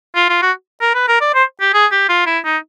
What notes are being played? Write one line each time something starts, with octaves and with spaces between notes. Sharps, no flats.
F4
F4
F#4
A#4
B4
A#4
D5
C5
G4
G#4
G4
F4
E4
D#4